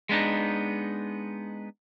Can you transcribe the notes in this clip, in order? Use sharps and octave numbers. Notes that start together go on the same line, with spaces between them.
G#3 B3 D4 D#4